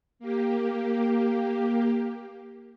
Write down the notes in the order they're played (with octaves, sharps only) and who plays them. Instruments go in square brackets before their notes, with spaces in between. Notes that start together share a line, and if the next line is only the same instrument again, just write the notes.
[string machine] A#3 G4